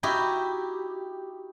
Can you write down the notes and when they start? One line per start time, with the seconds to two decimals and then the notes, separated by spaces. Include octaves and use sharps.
0.03 D#4 E4 F#4 G4